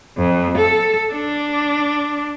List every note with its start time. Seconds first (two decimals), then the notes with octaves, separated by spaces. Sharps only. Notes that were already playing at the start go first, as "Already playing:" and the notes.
0.17 F2
0.57 A4
1.13 D4